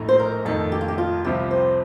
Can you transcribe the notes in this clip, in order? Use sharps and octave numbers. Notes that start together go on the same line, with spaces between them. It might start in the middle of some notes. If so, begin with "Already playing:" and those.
Already playing: A#1 A2 A3 D#4
C5
A#4
F2 D#3 A3 D#4 A4
G4
F4
G4
F4
C2 C3 F3 C4 F4 G4
C5